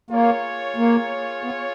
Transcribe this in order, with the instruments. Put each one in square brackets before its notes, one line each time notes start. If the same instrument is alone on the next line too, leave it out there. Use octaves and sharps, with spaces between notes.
[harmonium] A#3 [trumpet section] F4 G#4 C#5
[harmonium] A#3
B3